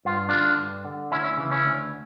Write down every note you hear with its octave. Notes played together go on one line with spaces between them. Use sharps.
G2 F4
D3 D4 F4
G2
D3
D2 C#4 E4
C#4 E4
C#3 E3
C#4 E4
D2